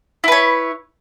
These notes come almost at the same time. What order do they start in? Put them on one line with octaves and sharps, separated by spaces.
E4 B4 C#5